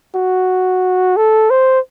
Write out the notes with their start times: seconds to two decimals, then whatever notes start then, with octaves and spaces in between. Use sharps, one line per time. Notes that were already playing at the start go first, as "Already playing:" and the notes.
0.15 F#4
1.17 A4
1.50 C5